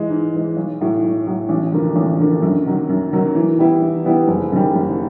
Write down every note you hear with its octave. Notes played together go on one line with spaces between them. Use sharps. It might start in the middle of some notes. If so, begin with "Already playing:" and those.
Already playing: G#2 E3 G#3
G#2
E3 G#3
B1
A2 F#3
B1
A2 F#3
A1
G2 D3 F3 A#3
A1
G2 D3 F3 A#3
F#2
D#3 F#3 A#3
F#2
D#3 F#3 A#3
E3
G3 B3 E4
E3
G3 B3 E4
F#1
F#2 D#3 G3
F#1